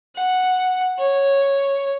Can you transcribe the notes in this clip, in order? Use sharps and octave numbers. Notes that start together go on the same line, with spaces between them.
F#5
C#5